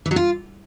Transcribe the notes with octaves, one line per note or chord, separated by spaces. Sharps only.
E3
F#3
F4